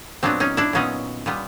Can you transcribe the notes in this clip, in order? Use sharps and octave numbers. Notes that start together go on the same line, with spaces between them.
A#2 F#3 B3 C4 D4
C#4 D#4
D4 E4
A#2 F#3 B3 C#4 D#4
A#2 G3 B3